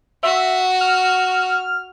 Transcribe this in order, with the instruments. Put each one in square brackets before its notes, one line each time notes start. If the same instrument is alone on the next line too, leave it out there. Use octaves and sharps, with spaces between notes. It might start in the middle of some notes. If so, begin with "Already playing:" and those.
[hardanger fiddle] F#4 [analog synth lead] E5
[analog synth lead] F6